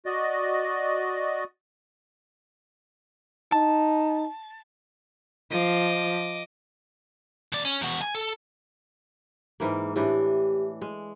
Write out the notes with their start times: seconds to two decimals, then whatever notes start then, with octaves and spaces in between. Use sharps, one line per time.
0.06 F#4 D5 D#5
3.52 D#4 A5
5.50 F3 D#5 D6
7.52 D#2 D5
7.65 C#4
7.81 E2 F#4
8.02 G#5
8.15 A4
9.60 G#2 E3 A#3
9.96 A2 E3 D4 G4
10.81 G#3